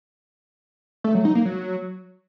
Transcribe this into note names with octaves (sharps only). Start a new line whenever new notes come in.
A3
F#3
D#4
A#3
F#3